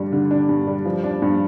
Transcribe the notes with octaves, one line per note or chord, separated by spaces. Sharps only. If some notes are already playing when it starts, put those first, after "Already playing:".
Already playing: G2 D3 G3 D4
D3
D4
G2
G3
F3
D4
G2